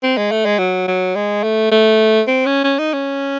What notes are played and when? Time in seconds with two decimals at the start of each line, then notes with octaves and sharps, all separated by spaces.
0.03 C4
0.17 G#3
0.31 A3
0.46 G#3
0.59 F#3
0.88 F#3
1.15 G#3
1.43 A3
1.71 A3
2.27 C4
2.46 C#4
2.64 C#4
2.79 D#4
2.93 C#4